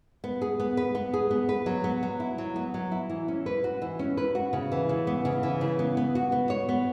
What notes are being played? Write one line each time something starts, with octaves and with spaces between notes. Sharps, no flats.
B3
G#4
B3
B4
B3
G#4
B3
B4
F#3
B3
F#3
E4
F#3
B3
F#3
E4
E3
C#4
B4
F#4
E3
C#4
B4
F#4
C#3
E3
C#3
B3
C#3
E3
C#3
B3
B3
F#4
B3
C#5
B3